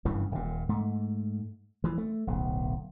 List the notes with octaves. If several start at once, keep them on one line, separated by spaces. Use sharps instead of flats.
F#1 G2 C#3 E3
D#1 A#2
G#2 A3
E3 F3
A3
D1 B1